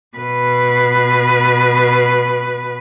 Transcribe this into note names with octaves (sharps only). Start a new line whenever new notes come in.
B2 B4